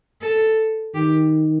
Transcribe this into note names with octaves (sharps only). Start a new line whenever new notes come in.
A4
D#3 G4